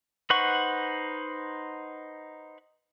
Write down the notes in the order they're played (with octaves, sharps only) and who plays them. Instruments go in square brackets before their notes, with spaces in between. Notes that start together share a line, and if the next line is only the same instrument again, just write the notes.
[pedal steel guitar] D#4 B4 C5 F#5 C#6